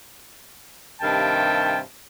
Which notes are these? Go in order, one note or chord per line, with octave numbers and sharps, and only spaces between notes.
G2 C3 D#3 F5 G5 A5